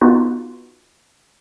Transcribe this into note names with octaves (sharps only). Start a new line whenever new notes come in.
B3 D#4 F4 F#4 B4